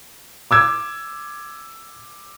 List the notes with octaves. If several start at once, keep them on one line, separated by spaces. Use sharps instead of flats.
D6 E6 G#6